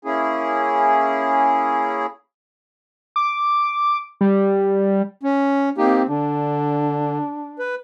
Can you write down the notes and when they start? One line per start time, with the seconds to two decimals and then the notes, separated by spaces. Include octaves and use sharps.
0.05 A#3 C#4 E4 G#4
3.16 D6
4.21 G3
5.23 C#4
5.78 A#3 C4 D#4 G4
6.09 D3 D4
7.59 B4